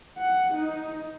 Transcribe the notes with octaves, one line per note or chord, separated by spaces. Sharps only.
F#5
D#4